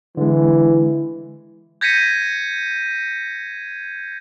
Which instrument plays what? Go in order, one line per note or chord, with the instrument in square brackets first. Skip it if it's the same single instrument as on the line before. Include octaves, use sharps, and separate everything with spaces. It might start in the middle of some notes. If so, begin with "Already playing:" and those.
[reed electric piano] D3 G#3 [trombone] E3
[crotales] G6 G#6 A#6 B6 C#7 D#7